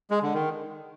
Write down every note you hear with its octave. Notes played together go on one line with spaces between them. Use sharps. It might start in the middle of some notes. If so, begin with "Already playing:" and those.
G#3
D3
D#3